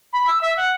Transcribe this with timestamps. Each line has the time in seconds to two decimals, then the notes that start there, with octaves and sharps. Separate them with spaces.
0.13 B5
0.27 E6
0.41 E5
0.57 F#5